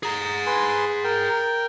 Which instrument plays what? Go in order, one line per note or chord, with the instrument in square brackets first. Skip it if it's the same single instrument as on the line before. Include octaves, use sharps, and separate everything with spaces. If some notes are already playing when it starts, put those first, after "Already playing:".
[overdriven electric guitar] G#4 A#5
[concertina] B4 G#5 C6
A#4 G5